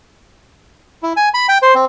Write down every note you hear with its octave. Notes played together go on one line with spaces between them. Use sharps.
E4
G#5
B5
G5
C5
C4